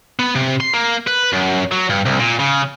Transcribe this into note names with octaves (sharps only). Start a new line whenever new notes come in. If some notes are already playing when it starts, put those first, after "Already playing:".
B3
C3
C6
A#3
B4
F#2
F#3
G2
C2
A#2
C#3